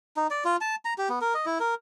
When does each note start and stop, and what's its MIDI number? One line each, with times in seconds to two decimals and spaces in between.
0.17 0.27 63
0.31 0.44 74
0.45 0.56 65
0.61 0.75 81
0.85 0.94 82
0.98 1.09 67
1.09 1.19 59
1.21 1.34 70
1.34 1.46 75
1.46 1.58 64
1.60 1.74 70